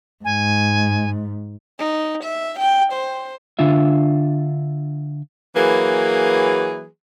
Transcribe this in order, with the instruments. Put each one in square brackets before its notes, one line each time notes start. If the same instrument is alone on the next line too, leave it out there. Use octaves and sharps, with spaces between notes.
[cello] G#2 [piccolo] G#5
[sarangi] D#4
E5
G5
C5
[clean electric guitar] D3 D4 F4 E5
[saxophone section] E3 F#3 A#3 G#4 B4